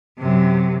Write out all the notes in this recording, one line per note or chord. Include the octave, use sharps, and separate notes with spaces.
F#2 C3